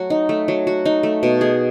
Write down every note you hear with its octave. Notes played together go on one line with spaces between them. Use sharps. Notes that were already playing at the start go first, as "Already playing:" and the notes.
Already playing: F#3 A3 F#4
D#4
A3
F#3
F#4
D#4
A3
B2
G#4